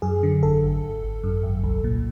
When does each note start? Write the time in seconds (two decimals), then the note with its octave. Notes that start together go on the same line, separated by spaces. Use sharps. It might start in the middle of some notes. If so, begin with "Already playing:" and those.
0.02 F#2 G#4
0.23 D3
0.42 G#1 A4
0.63 G#1
0.83 G#1
1.03 G#1
1.24 F#2
1.43 G#1
1.64 C2
1.84 A#2